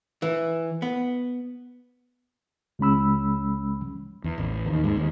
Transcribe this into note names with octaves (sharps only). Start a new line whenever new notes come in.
E3
B3
C#2 G#3 C#4 B5 E6
E2
A1
D#2
G#2
D#2